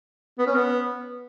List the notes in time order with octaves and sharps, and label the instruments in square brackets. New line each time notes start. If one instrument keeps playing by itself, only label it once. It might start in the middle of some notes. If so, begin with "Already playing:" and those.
[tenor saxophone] B3
C#4
B3